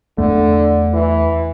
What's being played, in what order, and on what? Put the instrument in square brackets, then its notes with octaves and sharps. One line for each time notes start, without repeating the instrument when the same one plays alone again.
[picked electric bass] E2 A3 [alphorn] D3
[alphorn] E3